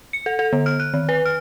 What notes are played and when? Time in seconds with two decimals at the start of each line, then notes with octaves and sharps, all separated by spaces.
0.13 C#7
0.26 A4
0.39 A4
0.53 D3
0.66 F6
0.80 F#6
0.94 D#3
1.09 B4
1.25 F6